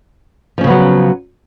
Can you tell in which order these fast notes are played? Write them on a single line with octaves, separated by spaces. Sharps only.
F3 C#4 C#3 B3 F#3